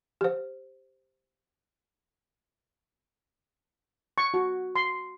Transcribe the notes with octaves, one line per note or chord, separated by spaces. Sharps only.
G4 C5
C#6
F#4
C6